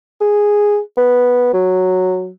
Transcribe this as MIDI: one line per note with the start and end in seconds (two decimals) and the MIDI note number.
0.21 0.79 68
0.97 1.53 59
1.54 2.30 54